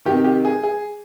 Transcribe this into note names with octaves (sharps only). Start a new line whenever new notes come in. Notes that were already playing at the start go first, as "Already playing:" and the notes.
C3 D#3 G4
G4
G#4
G#4